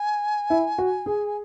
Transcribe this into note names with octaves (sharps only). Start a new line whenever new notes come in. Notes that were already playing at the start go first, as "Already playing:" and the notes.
Already playing: G#5
E4
F#4
G#4